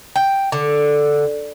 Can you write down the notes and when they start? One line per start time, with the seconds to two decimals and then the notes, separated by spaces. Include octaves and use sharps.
0.16 G5
0.52 D3